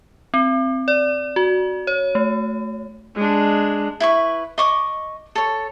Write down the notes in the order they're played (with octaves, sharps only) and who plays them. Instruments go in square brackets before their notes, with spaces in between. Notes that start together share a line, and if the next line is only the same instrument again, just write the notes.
[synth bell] C4
D5
F#4
C#5
A3
[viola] G#3 D4
[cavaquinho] E4 B4 C#6
D#5 C#6 D6
A4 C#5